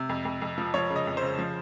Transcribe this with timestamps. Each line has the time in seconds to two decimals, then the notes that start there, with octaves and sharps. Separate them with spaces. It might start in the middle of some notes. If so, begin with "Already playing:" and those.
Already playing: C3
0.09 F2
0.25 F2
0.42 F2
0.58 F3
0.74 F3 C#5
0.90 C#3
0.96 D#5
1.07 F2
1.17 C5
1.23 C#3
1.39 F3